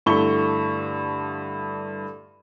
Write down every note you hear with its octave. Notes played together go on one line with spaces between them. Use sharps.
G2 D3 A3 E4 C#6 G7